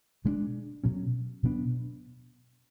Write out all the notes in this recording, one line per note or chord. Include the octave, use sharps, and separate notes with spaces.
B2 G#3 B3 D4
B2 F#3 C#4
B2 F#3 B3 D4